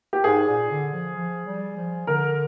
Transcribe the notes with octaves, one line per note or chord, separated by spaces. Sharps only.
G4
G#2 G#4
A#2
D3
F3
F3
G3
F3
D3 A#4